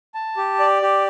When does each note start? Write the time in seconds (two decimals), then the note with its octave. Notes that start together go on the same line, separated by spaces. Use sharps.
0.14 A5
0.37 G4
0.60 D5
0.82 G4